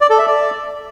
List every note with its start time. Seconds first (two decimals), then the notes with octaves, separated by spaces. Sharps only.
0.01 D5
0.10 A4
0.19 E5
0.27 D5